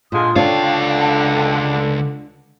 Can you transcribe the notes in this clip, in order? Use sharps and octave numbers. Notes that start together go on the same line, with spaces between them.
A#2 D3 G#3 F4 C6 D#6
C#2 D3 D4 F4 C#5 F5 G5 A5